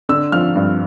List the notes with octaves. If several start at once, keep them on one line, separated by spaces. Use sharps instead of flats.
D3 E6
F3 F6
G2